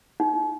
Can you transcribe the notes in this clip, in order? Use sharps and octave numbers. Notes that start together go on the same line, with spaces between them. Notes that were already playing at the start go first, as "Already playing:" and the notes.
D#4